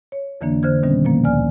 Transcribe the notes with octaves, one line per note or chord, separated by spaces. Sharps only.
C#5
F2 D3 E3 A#3 D4
D3 C5 F6 G#6
B2 D#3 G3 B3 C#4
A#2 F3 A#3
D2 D5 G#5 F6